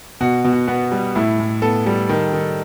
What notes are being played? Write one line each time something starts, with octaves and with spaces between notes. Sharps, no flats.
B2 F#4
B2
F#4
B3 F#4
G3
A2 E4
A2
B3 A4
G3
D#3
D#3